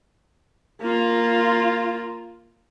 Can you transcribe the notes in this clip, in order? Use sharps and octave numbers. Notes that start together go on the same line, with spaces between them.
A#3 F4